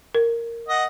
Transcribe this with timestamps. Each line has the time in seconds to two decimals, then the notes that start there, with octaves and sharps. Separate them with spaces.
0.15 A#4
0.68 D#5 F#5